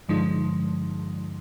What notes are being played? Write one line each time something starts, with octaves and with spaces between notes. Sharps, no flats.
G2 D3 F3 G#3 D#4